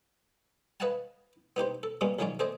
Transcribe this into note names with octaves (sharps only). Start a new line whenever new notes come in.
B4 D#5 F5 F#5 G#5 A5
B3 D#4 G4 C5
A4
B2 G3 G#3 A#3 B3 C#4
A#1 D#3 F#3 G#3 C#4 D5
A3 G#4 C5 D5 D#5